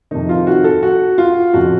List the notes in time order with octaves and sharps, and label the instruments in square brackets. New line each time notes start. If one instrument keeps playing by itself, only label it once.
[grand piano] F2 C3 D#3 D#4
F4
F#4
A4
F#4
F4
F2 C#3 F#4